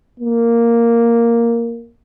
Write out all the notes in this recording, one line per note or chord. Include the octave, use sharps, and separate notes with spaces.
A#3